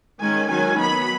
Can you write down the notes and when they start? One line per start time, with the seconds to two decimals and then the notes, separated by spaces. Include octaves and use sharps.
0.19 D#3 G#3 C#4 G#5
0.49 D#3 F#3 C#4 G#5
0.78 F#3 B3 B5